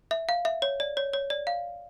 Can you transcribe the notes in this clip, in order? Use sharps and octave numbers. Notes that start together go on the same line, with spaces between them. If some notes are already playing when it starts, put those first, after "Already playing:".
E5
F5
E5
C#5
D5
C#5
C#5
D5
F5